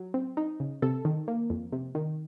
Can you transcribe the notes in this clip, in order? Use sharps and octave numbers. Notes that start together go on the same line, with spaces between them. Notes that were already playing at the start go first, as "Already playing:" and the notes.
Already playing: F#3
C4
D#4
C#3
C3 A4
D#3
A#3
F2
C3
D#3